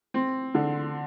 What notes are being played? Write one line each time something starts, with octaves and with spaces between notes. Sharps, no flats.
C4
D3